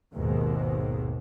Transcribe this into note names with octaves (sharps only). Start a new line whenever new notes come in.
G#1 D#2 G#2 B2 D#3